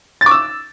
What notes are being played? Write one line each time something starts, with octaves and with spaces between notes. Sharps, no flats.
A6
D6
E6